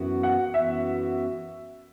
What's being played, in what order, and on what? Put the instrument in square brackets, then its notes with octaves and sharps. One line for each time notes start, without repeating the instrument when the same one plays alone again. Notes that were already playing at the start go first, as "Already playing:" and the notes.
Already playing: [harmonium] F#2 E3 B3 F#4
[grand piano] F#5
[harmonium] F#2 E3 B3 F#4 [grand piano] E5